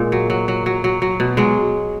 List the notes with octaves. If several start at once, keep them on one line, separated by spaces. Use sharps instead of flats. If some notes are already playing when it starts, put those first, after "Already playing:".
Already playing: A#2 G#3
F#3
F#3
F#3
F#3
F#3
F#3
B2
F#3 G#3